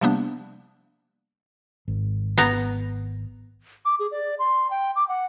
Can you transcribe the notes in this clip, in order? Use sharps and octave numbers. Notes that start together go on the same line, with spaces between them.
C3 F3 G3 A#3 B3 D4
G#1
B3 A#5
D6
G#4
D5
C6
G5
D6
F#5